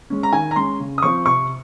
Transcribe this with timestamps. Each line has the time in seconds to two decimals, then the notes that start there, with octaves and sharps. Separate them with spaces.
0.10 G#3 C#4
0.23 A#5
0.33 D#3 G#5
0.51 A#5
0.56 G#3 C#4 C6
0.80 C#3
0.98 D#6
1.02 F3 C4 C#6
1.26 C3 C#6